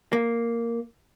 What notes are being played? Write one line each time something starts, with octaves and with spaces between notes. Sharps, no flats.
A#3